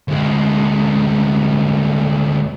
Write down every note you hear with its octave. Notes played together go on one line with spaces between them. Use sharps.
D2 G#3